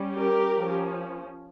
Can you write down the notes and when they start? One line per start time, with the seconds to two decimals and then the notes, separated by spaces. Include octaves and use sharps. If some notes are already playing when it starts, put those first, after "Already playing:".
Already playing: G3 C#4
0.16 G4 A#4
0.56 F3 C#4